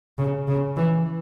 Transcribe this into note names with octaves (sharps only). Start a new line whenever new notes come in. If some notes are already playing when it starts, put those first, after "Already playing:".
C#3
C#3
E3